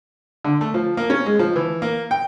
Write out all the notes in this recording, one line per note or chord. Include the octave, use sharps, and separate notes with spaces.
D3
A3
F3
A#3
C#4
G#3
F3
E3
A#3
G5